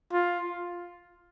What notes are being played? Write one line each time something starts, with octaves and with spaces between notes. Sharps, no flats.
F4